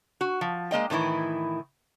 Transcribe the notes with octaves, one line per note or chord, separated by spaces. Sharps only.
F#4
F3
G#3 A#3 D#5 G5
A2 D#3 E3 E4